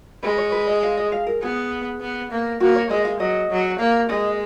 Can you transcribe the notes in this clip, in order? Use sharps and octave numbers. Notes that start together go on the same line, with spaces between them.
G#3 B4
C#5
B4
D#5
F5
D#5
F5
A#4
B3 G#4
B3
A#3
A#3 F#4
C#5
G#3 D#5
F5
F#3 D#5
F#3
A#3 F5
G#3 D#5